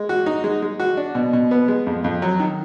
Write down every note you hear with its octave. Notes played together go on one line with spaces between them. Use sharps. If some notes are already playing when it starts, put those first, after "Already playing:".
Already playing: G#3
F#4
D#4
G#3
G#3
F#4
D4
B2
B2
B3
G#3
F2
F2
F#3
D#3